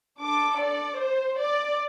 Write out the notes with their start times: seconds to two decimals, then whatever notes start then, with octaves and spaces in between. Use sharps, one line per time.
0.20 D4 A4 D6
0.60 D5
1.01 C5
1.41 D5